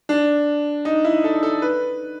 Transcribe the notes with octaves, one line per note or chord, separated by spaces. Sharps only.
D4
D#4
E4
A4
A4
B4